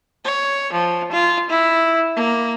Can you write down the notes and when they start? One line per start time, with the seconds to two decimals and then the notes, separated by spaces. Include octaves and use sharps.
0.25 C#5
0.72 F3
1.12 F4
1.49 E4
2.16 A#3